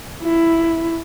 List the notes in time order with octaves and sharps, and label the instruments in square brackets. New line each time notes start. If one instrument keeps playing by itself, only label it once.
[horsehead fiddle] E4